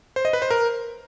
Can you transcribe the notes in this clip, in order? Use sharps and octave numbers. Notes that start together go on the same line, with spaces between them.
C5
D#5
B4
C5
A#4